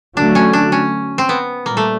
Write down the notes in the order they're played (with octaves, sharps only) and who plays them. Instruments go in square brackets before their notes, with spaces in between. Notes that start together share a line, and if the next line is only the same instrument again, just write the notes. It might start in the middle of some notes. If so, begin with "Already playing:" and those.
[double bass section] D3 F#3 A3 [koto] D4
[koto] C#4
D4
C#4
C4
B3
[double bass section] A#2 G3 [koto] A#3
[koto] A3